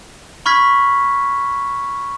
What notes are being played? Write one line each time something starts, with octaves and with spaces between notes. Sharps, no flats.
B5 C#6 F6 G#6 B6